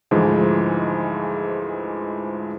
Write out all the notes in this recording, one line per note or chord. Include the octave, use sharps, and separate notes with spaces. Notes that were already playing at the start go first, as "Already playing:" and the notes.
D2 G#2 E3 F3 G#3